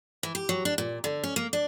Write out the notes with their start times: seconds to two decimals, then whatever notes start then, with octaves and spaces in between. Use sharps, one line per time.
0.23 E3
0.35 G4
0.49 F#3
0.65 D4
0.78 A#2
1.04 D3
1.24 C#4
1.36 A#3
1.53 D4